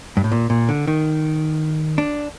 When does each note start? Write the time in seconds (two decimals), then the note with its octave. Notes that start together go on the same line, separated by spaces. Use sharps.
0.17 G2
0.24 A2
0.32 A#2
0.50 A#2
0.69 D3
0.87 D#3
1.98 D4